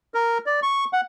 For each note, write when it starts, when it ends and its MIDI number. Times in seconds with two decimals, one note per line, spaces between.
0.14 0.38 70
0.46 0.60 74
0.63 0.85 85
0.93 1.01 78